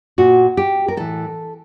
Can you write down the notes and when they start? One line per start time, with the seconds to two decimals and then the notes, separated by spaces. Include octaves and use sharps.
0.18 A#2 F#4
0.57 G4
0.88 A#4
0.97 A2 E3 A4